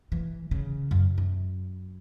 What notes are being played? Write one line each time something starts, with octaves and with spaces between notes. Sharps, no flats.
E3
C#3
F#2
F#2